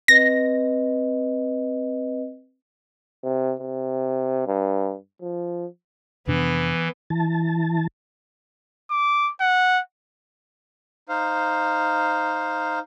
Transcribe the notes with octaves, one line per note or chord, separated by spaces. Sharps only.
C4 B4 D#5 A#6
C3
C3
G2
F3
F2 C3 E3 B3 D4
E3 A5
D6
F#5
D#4 C5 F5